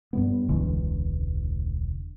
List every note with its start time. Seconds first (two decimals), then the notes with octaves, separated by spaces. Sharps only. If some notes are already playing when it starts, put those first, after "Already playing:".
0.13 G2 G3 B3
0.49 E1 C#2 D3 E3